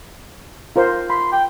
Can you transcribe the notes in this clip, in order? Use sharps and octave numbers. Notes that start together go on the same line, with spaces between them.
F4 A#4 C5
B5 C6
G5